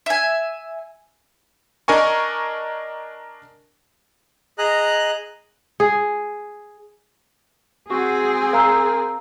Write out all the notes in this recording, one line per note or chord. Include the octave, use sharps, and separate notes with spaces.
E5 G#5
D4 A#4 D#5 G#5 C#6
G#4 D#5 A#5 F#6
G#4
C4 F#4 G#4
A#4 F5 A#5 E6